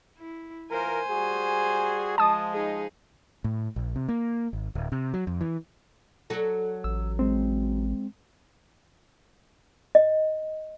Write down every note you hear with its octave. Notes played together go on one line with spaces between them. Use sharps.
E4
E3 F4 A#4 C5 G#5
G3 F#4 G#4
F3 G#3 A5 D#6
D#4 G#4
A2
A#1
C3
A#3
G#1
D1
C3
F#3
F2
E3
F#3 F#4 A4
A1 E6
G#3 C4
D#5